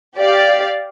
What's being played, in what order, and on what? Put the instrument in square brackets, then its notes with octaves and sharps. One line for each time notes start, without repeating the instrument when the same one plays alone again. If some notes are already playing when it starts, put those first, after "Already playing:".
[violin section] G4 D5 F5